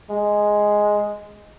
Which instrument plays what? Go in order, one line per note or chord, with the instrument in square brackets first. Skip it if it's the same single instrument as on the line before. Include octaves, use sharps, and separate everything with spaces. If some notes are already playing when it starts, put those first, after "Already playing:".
[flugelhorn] G#3